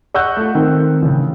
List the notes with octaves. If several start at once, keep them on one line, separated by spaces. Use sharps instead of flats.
D#5 F#5 C#6 E6 F#6 G6
A3 F4
D#3 C4
A1 C#3